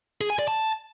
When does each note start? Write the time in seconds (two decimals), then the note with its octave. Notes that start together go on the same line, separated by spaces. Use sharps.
0.21 G#4
0.30 G#5
0.39 D5
0.48 A5